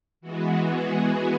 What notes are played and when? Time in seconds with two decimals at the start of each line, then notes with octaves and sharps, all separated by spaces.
0.21 E3 G#3 B3 F#4
0.63 G#4